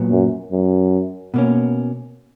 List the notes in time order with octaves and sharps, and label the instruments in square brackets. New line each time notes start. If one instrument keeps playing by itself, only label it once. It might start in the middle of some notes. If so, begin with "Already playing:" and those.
Already playing: [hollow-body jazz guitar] A#2 F#3 B3
[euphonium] F#2
F#2
[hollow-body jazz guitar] B2 A#3 C#4